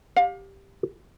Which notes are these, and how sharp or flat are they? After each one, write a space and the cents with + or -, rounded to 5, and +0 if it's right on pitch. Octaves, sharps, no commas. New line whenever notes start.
G4 +0 F5 +35